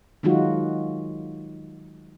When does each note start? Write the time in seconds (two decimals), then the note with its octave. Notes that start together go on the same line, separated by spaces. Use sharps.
0.23 D#3 F#3 G#3 D#4 F4 F#4